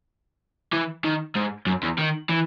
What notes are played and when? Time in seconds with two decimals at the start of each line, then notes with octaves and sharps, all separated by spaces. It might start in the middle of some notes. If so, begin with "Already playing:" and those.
0.73 E3
1.05 D#3
1.36 G#2
1.67 F#2
1.83 E2
1.98 D#3
2.29 E3